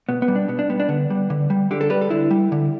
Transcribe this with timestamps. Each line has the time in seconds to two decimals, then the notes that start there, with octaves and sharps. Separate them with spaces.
0.09 B2 B3
0.22 B3
0.28 G3
0.35 D4
0.48 B2 B3
0.59 D4
0.70 G3 B3
0.80 D4
0.89 D3 B3
1.10 G3
1.30 D3
1.50 G3
1.71 D3 G4
1.81 A4
1.90 G3 B4
2.01 A4
2.10 D3 E4
2.31 G3
2.52 D3